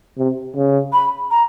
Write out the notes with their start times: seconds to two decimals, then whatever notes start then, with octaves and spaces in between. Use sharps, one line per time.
0.18 C3
0.56 C#3
0.93 B5
1.31 A#5